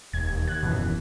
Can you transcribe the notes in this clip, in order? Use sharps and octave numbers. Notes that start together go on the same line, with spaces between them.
E1 D#2 G#6
F#6 G#6
D#1 F#2 B2 E3